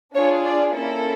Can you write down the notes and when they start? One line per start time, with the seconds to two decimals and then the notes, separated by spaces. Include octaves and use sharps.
0.14 D4 F4 G#4 C#5
0.45 D5
0.75 A#3 C#4 E4 A4